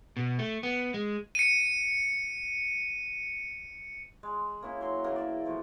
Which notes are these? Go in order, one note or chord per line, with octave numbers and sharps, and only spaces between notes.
B2
A3
B3
G#3
C#7 D#7
G#3
A#3 C#4 E4
F#3 C6
C#3 E3 A#3
D5 E5
B2 F3 A3